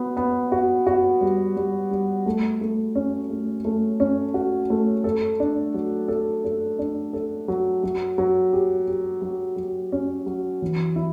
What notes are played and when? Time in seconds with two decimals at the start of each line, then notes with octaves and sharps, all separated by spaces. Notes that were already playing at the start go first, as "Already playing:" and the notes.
Already playing: B3 F#4
0.17 B3
0.52 F#4
0.87 F#4
1.21 G3
1.57 G3
1.91 G3
2.26 A3
2.61 A3
2.95 C#4
3.30 A3
3.65 A3
4.00 C#4
4.34 F#4
4.70 A3
5.04 A4
5.40 D4
5.74 F#3
6.08 A4
6.44 A4
6.79 D4
7.13 A4
7.48 F#3
7.83 F#3
8.18 F#3
8.53 G4
8.88 G4
9.22 F#3
9.57 F#3
9.92 C#4
10.26 F#3
10.62 E3
10.96 E4